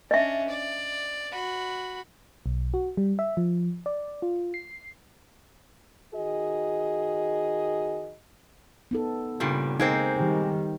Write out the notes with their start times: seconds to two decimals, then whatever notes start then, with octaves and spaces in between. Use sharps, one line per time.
0.11 C#4 D4 D#5 E5
0.48 D5
1.32 F#4 B5
2.46 B1
2.74 F#4
2.97 G3
3.19 E5
3.37 F3
3.86 D5
4.22 F4
4.54 C7
6.14 D#3 F#4 G#4 D#5
8.91 B3 D#4 A4
9.40 G2 A#2 C#3 G3
9.80 G#3 A#3 C4 D#4 C5
10.17 D#3 G3